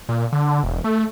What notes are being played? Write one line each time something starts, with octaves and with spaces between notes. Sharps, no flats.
A#2
D3
E1
A3